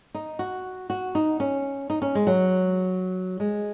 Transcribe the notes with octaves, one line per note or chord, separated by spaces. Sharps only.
D#4
F#4
F#4
D#4
C#4
D#4
C#4
G#3
F#3
G#3